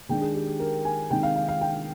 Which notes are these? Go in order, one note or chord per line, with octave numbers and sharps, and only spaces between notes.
D#3 G#3 D4 G5
G#4
G4
G#4
A#4
G#5
C3 D#3 G#3 D#4 G5
F5
F5
F5
G5